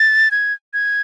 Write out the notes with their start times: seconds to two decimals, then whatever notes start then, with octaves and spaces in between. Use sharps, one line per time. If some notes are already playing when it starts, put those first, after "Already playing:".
Already playing: A6
0.31 G#6
0.73 G#6